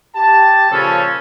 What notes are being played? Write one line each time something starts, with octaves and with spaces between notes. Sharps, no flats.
G4 A5
A#2 C#3 F3 C#4 A4